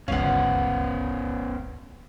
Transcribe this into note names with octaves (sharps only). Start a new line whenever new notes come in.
D1 G1 C#2 B3 C#4 F5 F#5